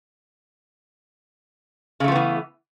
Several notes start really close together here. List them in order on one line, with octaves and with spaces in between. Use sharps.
C#3 A3 F3 B3 E3